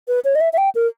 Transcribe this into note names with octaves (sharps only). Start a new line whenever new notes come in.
B4
C#5
D#5
E5
E5
G5
A#4